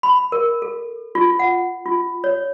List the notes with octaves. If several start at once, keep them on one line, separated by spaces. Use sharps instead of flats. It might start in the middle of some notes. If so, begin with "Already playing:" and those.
B5
A#4
A4
F4
F#5
F4
C#5